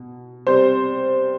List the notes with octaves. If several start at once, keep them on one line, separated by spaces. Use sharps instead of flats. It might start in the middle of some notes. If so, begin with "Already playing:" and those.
Already playing: B2
C3 G3 C5